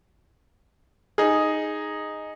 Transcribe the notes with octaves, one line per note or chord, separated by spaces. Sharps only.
D#4 G#4